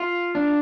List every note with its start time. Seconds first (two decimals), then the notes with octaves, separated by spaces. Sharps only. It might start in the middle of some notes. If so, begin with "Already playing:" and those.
Already playing: F4
0.35 D4